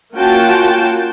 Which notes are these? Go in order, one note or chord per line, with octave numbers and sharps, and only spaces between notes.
A#3 C#4 F4 F#4 G5 A5